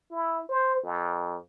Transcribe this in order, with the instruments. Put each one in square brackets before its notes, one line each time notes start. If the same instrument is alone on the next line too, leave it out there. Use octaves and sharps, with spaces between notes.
[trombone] E4
C5
F2